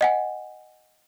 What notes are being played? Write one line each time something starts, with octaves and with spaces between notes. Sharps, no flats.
D#5 F#5 G#5